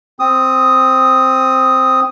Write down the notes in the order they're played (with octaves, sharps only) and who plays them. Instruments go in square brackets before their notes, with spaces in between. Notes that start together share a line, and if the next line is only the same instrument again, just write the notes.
[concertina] C4 D#6